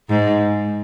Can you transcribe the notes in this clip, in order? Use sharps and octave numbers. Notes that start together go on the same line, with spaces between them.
G#2